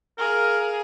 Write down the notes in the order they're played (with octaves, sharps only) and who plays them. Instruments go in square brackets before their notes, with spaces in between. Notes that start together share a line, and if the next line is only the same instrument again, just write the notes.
[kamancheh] G#4 F5 [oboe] A#4